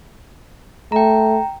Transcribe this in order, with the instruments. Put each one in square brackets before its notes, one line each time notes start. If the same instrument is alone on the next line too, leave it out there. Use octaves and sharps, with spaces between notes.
[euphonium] A3 [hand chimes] G5 A#5